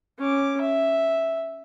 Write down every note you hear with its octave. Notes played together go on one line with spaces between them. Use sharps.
C#4 D6
E5